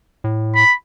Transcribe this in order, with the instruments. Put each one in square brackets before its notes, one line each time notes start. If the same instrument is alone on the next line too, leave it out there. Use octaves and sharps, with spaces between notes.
[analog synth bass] A2
[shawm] B5